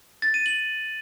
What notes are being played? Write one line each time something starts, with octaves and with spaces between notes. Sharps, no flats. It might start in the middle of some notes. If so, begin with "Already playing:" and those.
A6
D#7
F#7